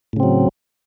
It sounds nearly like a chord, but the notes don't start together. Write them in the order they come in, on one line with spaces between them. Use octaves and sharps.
A2 C#3 C4 F#3